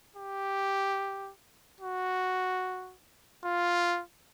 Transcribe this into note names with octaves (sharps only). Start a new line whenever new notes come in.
G4
F#4
F4